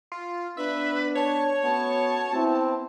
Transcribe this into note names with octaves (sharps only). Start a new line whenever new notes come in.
F4
B3 D4 B4 E5
C#5 A5
A3 B3 C#4 F#4 A5
B3 C4 E4